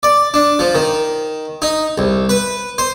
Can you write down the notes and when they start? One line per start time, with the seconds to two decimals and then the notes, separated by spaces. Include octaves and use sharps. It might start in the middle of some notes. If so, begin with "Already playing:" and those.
0.03 D5
0.34 D4
0.59 F3
0.75 D#3
1.62 D#4
1.98 C2
2.29 B4
2.78 C5